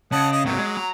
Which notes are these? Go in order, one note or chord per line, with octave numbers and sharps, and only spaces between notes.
C#3 D#5 F#5 A5
D#5
G#2 C3 F#3
G#3
A#5